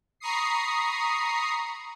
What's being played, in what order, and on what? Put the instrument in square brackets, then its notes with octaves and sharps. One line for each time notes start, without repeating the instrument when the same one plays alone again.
[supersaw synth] A#5 B5 C#6 D#6 C7